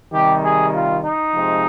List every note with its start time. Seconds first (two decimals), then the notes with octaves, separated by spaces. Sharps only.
0.13 C3 D#3 G3 G4
0.43 G#4
0.73 F4
1.04 D#4
1.33 C3 F3 G#3 C4